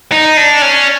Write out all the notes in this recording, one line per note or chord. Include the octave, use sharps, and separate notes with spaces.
D#4
D4
C#4